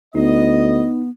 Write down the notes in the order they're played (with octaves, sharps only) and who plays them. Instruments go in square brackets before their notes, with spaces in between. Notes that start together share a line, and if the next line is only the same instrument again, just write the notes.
[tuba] D2 [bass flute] B3 [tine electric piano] D#4 [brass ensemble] D#5